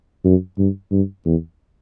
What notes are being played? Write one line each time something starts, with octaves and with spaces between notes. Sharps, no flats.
F#2
G2
G2
E2